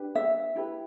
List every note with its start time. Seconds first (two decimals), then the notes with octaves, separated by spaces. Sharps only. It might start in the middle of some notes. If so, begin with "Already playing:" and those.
Already playing: D4 G4 B4
0.15 E5
0.56 E4 G4 B4